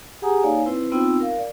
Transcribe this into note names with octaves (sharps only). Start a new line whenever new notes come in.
G4 G#4 F#5 G#5 A#5 D#6
A#3 D#4 C#5 D5 F5 G#5
C4 E4 B4 C5
B3 C4 D#4 F4 G5 E6
A#4 F5
D5